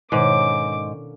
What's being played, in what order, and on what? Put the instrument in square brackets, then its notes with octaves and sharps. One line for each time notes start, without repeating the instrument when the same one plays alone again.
[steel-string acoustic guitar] G#2 [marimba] B2 D#3 [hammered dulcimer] D3 A#3 C#4 [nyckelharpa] D6